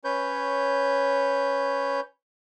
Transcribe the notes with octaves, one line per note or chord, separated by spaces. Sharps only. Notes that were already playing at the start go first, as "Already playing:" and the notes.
C#4 B4 C#5 G6